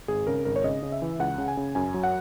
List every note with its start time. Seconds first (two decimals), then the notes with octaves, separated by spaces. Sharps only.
0.08 G#1 G#4
0.27 C#3 A#4
0.45 G#1 A#4
0.56 C#5
0.64 C#3 D#5
0.83 C#3
0.92 E5
1.02 E3
1.19 C#2 F#5
1.38 C#3
1.48 G#5
1.57 C#3
1.75 F#2 G#5
1.94 F#3
2.03 F#5